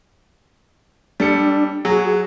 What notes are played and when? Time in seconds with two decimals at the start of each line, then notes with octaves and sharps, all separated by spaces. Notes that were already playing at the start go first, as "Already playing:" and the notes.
1.20 G3 D4 A4 C#7
1.85 F#3 F#4 G#4